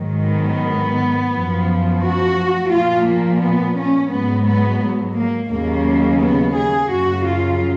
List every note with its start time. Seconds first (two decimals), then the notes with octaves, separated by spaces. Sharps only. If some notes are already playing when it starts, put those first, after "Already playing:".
Already playing: G#2 D#3 F#3
0.26 B3
1.32 F#2 F3
2.02 F#4
2.71 A#2 F3 F4
3.06 A#3
3.42 B3
3.77 C#4
4.11 G#2 F#3 B3
4.46 B3
5.16 A#3
5.51 D#2 C#3 F#3 A#3
6.20 B3
6.55 G#4
6.90 F#2 C#3 F#3 F#4
7.26 F4